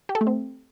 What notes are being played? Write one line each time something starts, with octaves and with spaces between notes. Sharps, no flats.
G4
A4
A3
C4